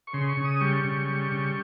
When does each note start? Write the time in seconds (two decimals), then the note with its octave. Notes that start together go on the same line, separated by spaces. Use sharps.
0.07 C#6
0.14 C#3 C6
0.29 C#6
0.37 C#3
0.45 D#6
0.61 G3 C#6
0.84 C#3
1.08 G3
1.32 C#3